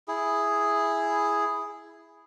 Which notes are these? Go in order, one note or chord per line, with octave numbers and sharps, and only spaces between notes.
E4 G#4